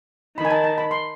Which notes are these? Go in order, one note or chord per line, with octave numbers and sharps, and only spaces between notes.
D#3 B5
G#5
A5
A5
B5
C6